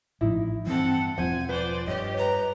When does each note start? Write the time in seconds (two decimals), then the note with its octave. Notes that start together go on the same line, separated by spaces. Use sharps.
0.21 A1 A2 F3 D#4 E4
0.67 G2 E3 C4 A4 F#5
1.17 E1 F3 C4 F4 C5 F#5 G#5
1.49 B4 C5 D5
1.87 G2 G4 C#5 D#5
2.17 B4 A#5